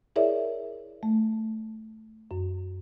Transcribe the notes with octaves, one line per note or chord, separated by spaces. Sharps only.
E4 G#4 A#4 C#5 D5 E5
A3
F#2